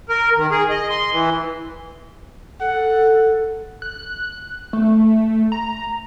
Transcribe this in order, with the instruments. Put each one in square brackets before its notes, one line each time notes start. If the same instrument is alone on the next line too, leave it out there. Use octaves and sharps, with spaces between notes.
[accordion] A#4
D#3
G#4
D#5
C6
E3
[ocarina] A4 [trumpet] F#5
[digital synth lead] F#6
A3
A#5